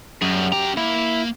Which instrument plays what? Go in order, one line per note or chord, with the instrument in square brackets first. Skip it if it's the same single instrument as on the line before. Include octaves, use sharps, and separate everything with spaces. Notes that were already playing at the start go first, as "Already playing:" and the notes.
[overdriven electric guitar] F#2 [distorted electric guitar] G3 G#4
[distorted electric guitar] F#2 A#5 [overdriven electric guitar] G4
[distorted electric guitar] A#3 [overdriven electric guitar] E4